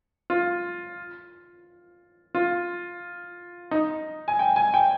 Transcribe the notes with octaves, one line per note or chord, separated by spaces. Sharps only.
F4
F4
D#4
G#5
G5
G#5
G5